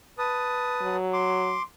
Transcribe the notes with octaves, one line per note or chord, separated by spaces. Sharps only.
B4 A5 D#6
F#3
C6 D6